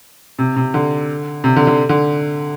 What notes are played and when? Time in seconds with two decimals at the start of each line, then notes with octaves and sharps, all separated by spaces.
0.39 C3
0.56 C3
0.74 D3
1.44 C3
1.56 D3
1.67 D3
1.89 D3